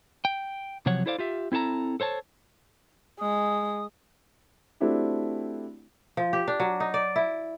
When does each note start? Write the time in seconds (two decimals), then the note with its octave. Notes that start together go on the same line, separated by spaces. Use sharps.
0.25 G5
0.86 C3 F3 F#3 C#5 F#5
1.06 E4 A4 C5 D5 F5
1.18 F4 G4 E5
1.52 C4 E4 A4 A5 A#5
2.00 A4 C5 C#5 A5
3.20 G#3 D#6
4.80 A3 C4 D4 E4 F#4 G4
6.17 F3
6.33 G4
6.48 D4
6.60 F#3
6.80 D#4
6.94 D5
7.16 E4